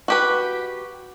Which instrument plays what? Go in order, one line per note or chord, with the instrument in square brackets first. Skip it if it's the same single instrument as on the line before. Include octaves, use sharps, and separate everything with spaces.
[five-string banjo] F#4 G4 B4